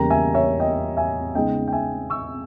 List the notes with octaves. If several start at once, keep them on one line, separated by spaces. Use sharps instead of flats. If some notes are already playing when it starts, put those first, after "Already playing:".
Already playing: E2 C#3 G3 A#3 G5 A#5
E5 G#5
C#5 E5
D#5 G5
E5 G#5
C#3 G#3 B3 D#4 D#5 G5
G5
E5 G#5
C#6 E6